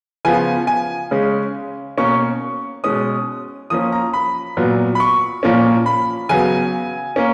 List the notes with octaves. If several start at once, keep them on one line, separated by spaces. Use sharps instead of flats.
C#3 F3 B3 G#5
G#5
C#3 G#3 C#4
B2 A#3 C#4 C#6
B2 G#3 C#4 D#6
F3 A#3 C#4 D#6
A#5
B5
A#2 F#3 B3
B5
C#6
A#2 F3 A#3 C#4
B5
C#3 F#3 B3 G#5
A#3 C#4